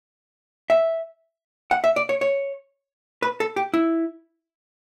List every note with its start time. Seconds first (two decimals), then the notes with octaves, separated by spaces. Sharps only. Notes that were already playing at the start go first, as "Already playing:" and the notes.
0.70 E5
1.71 F#5
1.84 E5
1.96 D5
2.09 C#5
2.21 C#5
3.22 B4
3.40 A4
3.56 G4
3.74 E4